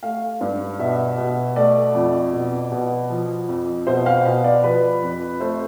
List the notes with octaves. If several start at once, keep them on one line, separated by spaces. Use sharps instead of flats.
A3 F5
G2
B2 E5
B2
A3 D5
F2
B2
B2
F3
F2
B2 C5
F5
B2 F5
D5
F3 B4
F2
A3 C5